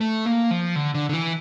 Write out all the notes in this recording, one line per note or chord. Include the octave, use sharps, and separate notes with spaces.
A3
A#3
F3
D3
D3
D3
E3